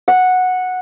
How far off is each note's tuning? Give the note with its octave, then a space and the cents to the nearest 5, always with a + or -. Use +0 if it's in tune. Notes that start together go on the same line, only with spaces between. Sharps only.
F#5 -10